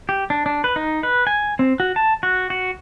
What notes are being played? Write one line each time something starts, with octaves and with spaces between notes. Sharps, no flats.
G4
D4
D4
B4
D#4
B4
G#5
C4
F#4
A5
F#4
F#4